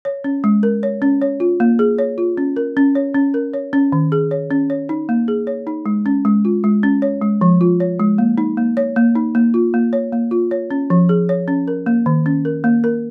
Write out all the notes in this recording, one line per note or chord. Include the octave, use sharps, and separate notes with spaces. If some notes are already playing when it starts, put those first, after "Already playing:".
C#5
C#4
G#3
A#4
C#5
C#4
C#5
F4
A#3
G#4
C#5
F4
C#4
A#4
C#4
C#5
C#4
A#4
C#5
C#4
D#3
G#4
C#5
C#4
C#5
D#4
A#3
G#4
C#5
D#4
G#3
C#4
G#3
F4
G#3
C#4
C#5
G#3
F3
F4
C#5
G#3
A#3
D#4
A#3
C#5
A#3
D#4
A#3
F4
A#3
C#5
A#3
F4
C#5
C#4
F3
G#4
C#5
C#4
A#4
A#3
D#3
C#4
A#4
A#3
A#4